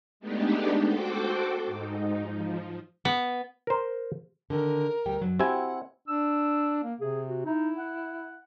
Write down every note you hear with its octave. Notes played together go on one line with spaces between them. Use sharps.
G#3 A3 B3 D4 D#4 G4
F#4 A4 C5 G5 D6
G#2 D#4
F3
B3
A#4 C5
D3 D#3 A4 A#4
D2 G3 G5
F#2 E3 F#3
C4 E4 F#4 G4 F#5 G#5
D4 E6
A#3
C3 G#4
F#4
D#4 E4
F#5